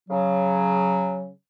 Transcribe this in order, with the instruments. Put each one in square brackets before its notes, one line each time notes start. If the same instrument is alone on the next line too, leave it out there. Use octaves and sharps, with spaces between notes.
[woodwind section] C#3 F#3